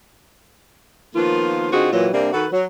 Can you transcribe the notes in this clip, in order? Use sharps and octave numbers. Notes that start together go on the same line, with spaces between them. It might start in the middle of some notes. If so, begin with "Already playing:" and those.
D#3 F3 A#3 B3 F4
D3 C4 D#4 F4 F#4 G#4
A#2 E3 F#3
C3 G3 A#3 C4 D4
D#3 F#4 A4 B4
F#3